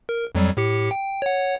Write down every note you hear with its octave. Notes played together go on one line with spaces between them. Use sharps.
A#4
F2 F#3 G3
A2 G4 C#7
G5
C#5 F#5